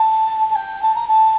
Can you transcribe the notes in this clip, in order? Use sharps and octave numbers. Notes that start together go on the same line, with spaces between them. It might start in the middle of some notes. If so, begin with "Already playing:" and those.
Already playing: A5
A5
G5
A5
A#5
A5